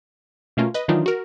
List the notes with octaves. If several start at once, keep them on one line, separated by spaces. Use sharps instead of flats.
B2 A3 A#3 C#4 F4
B4 D#5
D#3 E3 F#3 D4 D#4 F4
F#4 A#4